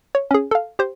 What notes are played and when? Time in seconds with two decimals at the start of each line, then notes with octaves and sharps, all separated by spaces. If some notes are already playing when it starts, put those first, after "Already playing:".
0.15 C#5
0.31 C#4 G#4
0.51 A4 F5
0.79 G4 C5